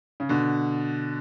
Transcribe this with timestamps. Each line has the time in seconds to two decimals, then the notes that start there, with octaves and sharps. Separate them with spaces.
0.20 C#3
0.29 B2 D3